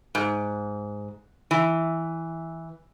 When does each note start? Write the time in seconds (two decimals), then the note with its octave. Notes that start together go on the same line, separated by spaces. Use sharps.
0.15 G#2
1.51 E3